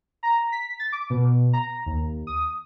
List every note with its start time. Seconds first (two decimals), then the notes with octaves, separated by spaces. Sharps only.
0.23 A#5
0.52 B6
0.80 A6
0.92 D6
1.10 B2
1.53 A#5
1.86 D#2
2.27 D#6